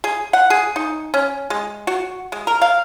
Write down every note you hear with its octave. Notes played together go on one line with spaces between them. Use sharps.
G#4
F#5
G#4
D#4
C#4
G#3
F#4
G#3
A#4
F5